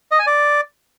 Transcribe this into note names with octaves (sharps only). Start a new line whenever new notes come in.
D#5
G#5
D5